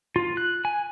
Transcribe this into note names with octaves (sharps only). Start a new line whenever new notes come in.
F4
F#6
G#5